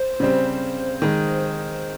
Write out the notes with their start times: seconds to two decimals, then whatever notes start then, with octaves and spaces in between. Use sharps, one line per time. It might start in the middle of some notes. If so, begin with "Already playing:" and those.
Already playing: C5
0.20 C#3 G3 C4
1.02 D#3 G#3